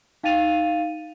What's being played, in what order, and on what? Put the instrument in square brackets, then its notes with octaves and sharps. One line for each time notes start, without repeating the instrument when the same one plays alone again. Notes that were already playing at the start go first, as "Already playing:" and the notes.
[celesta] D#4 F5 G5 A6 D#7 F7